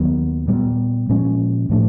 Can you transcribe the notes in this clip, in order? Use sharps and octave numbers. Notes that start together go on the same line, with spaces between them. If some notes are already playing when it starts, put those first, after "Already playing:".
Already playing: D#2 D#3 F#3 B3
A#2 G3 B3
A#2 F3 G#3 C#4
A2 F3 A3 D4